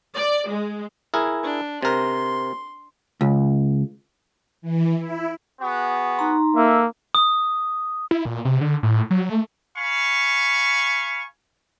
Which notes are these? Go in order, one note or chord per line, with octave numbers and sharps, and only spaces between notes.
D5
G#3
E4 G#4 A#4
D4
C3 A#4 C6
C#2
E3
E4
B3 F#4 G#4
D#4 A#5 C6
A#3 A4 E5
D#6
E4
A#2
C3
D3
A2
F#3
A3
F5 G#5 B5 C#6